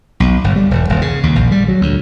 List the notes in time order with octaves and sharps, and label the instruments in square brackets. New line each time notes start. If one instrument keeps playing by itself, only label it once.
[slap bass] B1
G1
G3
E1
D#1
C#3
D#2
A#1
G3
F#3
D2